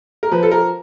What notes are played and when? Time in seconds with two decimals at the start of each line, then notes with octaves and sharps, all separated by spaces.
0.23 A#4
0.31 F3 B4
0.43 A4
0.51 A#4